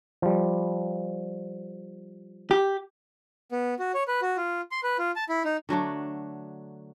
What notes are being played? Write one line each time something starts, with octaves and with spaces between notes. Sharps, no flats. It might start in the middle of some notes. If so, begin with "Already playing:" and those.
F3 G3
G4
B3
F#4
C#5
B4
F#4
F4
C6
B4
F4
A5
E4
D#4
D3 F#3 A3 D4